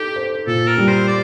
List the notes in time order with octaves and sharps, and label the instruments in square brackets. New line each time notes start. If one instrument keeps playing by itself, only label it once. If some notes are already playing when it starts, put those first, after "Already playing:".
Already playing: [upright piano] D#4 A4 [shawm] G4
[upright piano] C5
[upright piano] A#2 [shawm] A4
[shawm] A#4
[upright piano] G3
[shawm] C5
D5